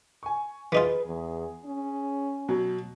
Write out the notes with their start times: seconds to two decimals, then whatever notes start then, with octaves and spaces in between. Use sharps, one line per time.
0.23 G#5 C#6
0.72 E3 D#4 F4 G#4 B4
1.06 E2
1.65 C#4
2.49 B2 F#3